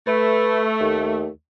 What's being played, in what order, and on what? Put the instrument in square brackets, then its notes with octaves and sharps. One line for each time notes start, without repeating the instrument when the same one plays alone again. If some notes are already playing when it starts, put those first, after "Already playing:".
[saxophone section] A3 [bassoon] B4
[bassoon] D#2